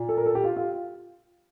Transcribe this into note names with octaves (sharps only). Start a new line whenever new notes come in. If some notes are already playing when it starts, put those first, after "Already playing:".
Already playing: A#2
A4
A#4
A4
G4
F4
F4